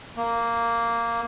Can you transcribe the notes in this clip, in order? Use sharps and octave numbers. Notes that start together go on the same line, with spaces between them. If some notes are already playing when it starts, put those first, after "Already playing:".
A#3